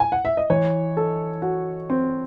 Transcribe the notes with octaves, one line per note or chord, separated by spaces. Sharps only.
G#5
F#5
E5
D#5
E3 C#5
A4
F#4
C4